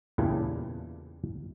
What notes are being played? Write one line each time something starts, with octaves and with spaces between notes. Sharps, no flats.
E2 A#2 C#3 E3 G3 D4